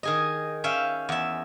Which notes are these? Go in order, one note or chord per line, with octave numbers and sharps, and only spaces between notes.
D#3 G#4 D#5
C#4 E5 F5 G5
E2 E5